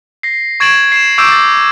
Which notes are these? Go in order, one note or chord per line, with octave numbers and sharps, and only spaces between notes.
A#6 C7
C#6 G#6 A6 D7 E7 F#7
C7 E7
C#6 D6 E6 G6 D7 E7
A6